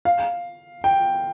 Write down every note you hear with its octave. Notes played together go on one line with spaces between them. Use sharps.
F5
G5